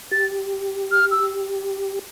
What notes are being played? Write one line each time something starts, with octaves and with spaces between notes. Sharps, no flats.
G4 A6
F6
E6